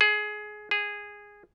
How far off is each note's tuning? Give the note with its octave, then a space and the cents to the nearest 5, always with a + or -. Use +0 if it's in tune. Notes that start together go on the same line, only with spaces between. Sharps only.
G#4 +20
G#4 -10